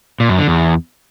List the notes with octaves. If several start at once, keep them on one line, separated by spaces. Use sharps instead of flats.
A#2
F#2
D3
E2